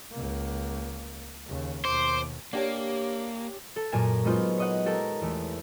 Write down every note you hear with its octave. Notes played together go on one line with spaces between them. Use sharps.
C#2 A#3
D#2 C#3
D#2 B2 C5 D6
A#3 D4 G4 C#5
A4
F#2 A#2 A#4 G#5 E7
F#3 G#3 B3 D#4 F4 C5
C#5 D#5 F#5
G4 A4 A#4
E2 A3